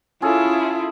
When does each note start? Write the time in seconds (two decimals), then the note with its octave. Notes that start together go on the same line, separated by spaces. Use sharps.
0.22 C#4 E4 F4 G#4 A4